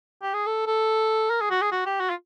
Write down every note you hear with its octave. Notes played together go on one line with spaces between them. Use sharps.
G4
G#4
A4
A4
A#4
G#4
F#4
G#4
F#4
G4
F#4
F4